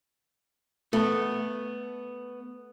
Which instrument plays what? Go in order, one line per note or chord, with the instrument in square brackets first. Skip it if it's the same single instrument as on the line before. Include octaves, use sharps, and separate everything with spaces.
[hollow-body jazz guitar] A3 B3